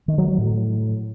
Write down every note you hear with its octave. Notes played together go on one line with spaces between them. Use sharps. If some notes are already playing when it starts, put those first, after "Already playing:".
D#3
F#3
F#3
A2